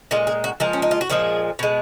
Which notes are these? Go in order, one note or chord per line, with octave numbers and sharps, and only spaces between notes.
A#2 G#3 F4
G#4
F#4
A#2 F3 G#3 A#4
C#4
D#4
F4
F#4
A#2 F3 G#3 G#4
B2 G#3